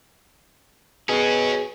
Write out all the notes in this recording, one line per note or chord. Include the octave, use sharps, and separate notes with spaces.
B2 F#3 C#4 G#4